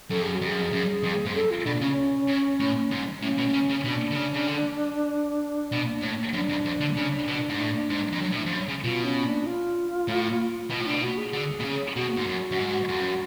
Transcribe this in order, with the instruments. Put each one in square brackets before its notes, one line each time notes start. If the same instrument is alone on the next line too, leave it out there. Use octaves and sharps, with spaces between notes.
[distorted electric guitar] F#2 [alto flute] A4
[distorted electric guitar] F2
[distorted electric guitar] F#2 [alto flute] G#4
[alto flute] F#4
[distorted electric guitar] F2
[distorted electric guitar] F#2 [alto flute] G#4
[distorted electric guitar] F2
F#2
F2
G#2
[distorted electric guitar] F#2 [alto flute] A4
[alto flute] F4
[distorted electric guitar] B2 [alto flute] D4
[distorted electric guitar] C#3 [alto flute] C#4
[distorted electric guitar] C#3
A2
G#2
[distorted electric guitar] A2 [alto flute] C#4
[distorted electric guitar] B2
C#3
C#3
[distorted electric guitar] B2 [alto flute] D4
[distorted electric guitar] D3
C#3
C#3
D3
B2
A2
[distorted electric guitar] F#2 [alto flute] D4
[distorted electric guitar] F2
F2
D3
C#3
B2
G#2
A2
G#2
F2
F#2
B2
A2
F2
F#2
C#3
[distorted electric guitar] B2 [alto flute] F4
[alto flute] C#4
D4
F4
[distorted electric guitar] A2
[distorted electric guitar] B2 [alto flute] F4
[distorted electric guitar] A2
[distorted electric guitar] B2 [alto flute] D4
[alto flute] F#4
G#4
[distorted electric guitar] D3
B2
C#3
[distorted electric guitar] B2 [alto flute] F#4
[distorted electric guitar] G#2
F#2
F#2
G#2
F2
F#2